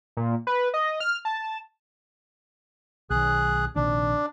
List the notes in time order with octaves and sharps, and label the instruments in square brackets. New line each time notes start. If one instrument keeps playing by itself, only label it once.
[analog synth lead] A#2
B4
D#5
F6
A5
[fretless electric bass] B1 D#3 [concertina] G#4 F#6
[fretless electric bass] A#1 C3 D#3 [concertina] D4